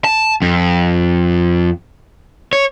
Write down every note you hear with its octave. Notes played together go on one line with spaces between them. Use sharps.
A5
F2
C#5